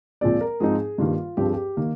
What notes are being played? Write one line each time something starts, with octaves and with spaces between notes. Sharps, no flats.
A#2 F3 G#3 C4 D5
A#4
G#2 F3 C4 D#4 G#4
G2 D#3 G3 A#3 F4
G2 F3 C4 G4
G#4
G4
D#3 A#3